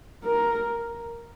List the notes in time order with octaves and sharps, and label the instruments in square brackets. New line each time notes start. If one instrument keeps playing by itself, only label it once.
[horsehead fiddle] A#4